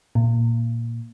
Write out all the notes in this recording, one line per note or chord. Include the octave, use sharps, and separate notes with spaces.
A#2